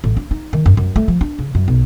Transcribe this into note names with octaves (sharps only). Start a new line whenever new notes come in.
A1
D4
D#4
D#3
F#2
F#2
A3
F3
D4
C#3
F#2
B1